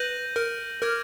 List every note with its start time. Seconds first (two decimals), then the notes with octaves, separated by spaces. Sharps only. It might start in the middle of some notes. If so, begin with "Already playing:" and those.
Already playing: B4 G6 A#6 D#7 F#7
0.36 A#4
0.82 A#4 D6 F6 G#6